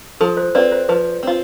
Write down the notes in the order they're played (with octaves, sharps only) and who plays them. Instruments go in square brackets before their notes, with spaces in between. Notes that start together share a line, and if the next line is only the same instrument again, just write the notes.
[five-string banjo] F3 [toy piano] A4
[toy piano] C5
[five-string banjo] C4 F4 [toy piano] B4 D5
[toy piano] C5
[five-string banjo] F3 [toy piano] B4
[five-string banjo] C4 F4